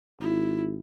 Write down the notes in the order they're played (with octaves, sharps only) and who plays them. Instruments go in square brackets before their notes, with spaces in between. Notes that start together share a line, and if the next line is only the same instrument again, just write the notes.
[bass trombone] G#1 [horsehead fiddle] E4